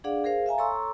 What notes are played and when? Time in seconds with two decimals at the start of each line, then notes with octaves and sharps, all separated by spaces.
0.04 D4 G#4 D5 F5 F#5
0.24 G#4 A#4 C5 F5
0.46 E5 F5 G#5 A#5
0.58 A4 C#5 A#5 C6 C#6 E6